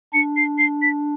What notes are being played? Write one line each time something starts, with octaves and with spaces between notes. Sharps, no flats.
D4 C#7
C7
C7
B6